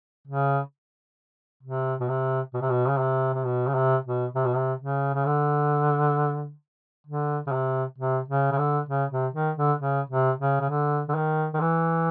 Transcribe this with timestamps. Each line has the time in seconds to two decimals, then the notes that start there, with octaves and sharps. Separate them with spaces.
0.27 C#3
1.63 C3
2.00 B2
2.09 C3
2.54 B2
2.61 C3
2.70 B2
2.89 C#3
2.99 C3
3.33 C3
3.44 B2
3.68 C#3
3.75 C3
4.05 B2
4.35 C3
4.45 B2
4.56 C3
4.81 C#3
5.14 C#3
5.26 D3
7.06 D3
7.47 C#3
7.52 C3
7.98 C3
8.28 C#3
8.52 C#3
8.58 D3
8.89 C#3
9.11 C3
9.34 D#3
9.57 D3
9.79 C#3
10.10 C3
10.39 C#3
10.60 C#3
10.70 D3
11.09 D3
11.15 D#3
11.54 D#3
11.61 E3